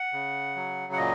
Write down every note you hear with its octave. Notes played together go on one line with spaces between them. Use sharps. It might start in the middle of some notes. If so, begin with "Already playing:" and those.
Already playing: F#5
C#3
F#3
F#5
A#2 D#5